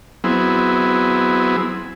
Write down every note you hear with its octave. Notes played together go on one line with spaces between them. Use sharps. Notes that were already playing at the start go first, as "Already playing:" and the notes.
F#3 B3 C4 E4 G#4